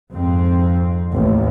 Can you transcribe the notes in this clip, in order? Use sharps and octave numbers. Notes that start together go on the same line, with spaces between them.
F2 G#2 C4
A1 D#2